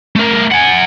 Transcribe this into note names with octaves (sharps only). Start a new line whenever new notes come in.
A3 A#4
F#5 G#5